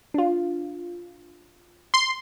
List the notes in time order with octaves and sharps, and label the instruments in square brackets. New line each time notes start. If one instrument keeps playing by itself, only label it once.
[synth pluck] D4 F4
[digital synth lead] C6